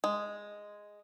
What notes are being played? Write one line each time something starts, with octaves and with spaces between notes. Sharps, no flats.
G#3